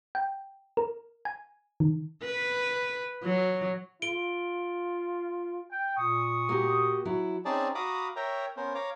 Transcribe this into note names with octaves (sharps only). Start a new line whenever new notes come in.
G5
A#4
G#5
D#3
B4
F#3
F4 D7 G7
G5
A#2 C#6 D#6
A#3 F#4 G4
F#3 E4
C4 C#4 D#4 G#4 D5 A5
F#4 F5 A#5 B5 D6 D#6
A#4 C#5 E5 G5 A#5
B3 C#4 A#4 C5
C#5 F5 A#5 D6